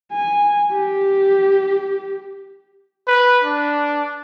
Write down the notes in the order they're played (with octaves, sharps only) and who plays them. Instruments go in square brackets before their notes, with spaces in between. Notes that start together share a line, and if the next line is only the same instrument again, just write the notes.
[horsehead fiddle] G#5
G4
[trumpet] B4
D4